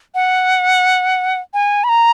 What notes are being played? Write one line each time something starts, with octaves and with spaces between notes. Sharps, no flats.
F#5
G#5
B5
A#5